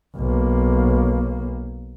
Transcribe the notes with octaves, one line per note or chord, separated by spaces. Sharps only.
B1 A#3